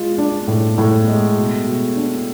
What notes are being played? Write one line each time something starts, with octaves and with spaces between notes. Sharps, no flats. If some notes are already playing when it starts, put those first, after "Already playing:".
Already playing: G#3 F4
D4
A2
A2
G#3
B2
B2
D4